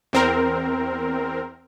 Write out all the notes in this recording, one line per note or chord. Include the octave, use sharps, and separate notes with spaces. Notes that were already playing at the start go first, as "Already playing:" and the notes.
E2 C4 A#4